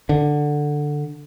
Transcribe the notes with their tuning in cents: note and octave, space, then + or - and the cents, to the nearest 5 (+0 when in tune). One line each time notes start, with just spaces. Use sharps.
D3 +5